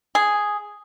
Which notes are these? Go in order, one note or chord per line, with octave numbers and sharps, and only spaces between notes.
G#4